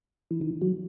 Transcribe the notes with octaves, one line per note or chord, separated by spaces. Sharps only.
E3
D#3
F#3